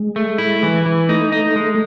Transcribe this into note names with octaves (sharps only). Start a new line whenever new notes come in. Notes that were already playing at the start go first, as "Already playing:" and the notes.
Already playing: G#3
A3
E4
E3
E3
A3 D#4
D#4
G#3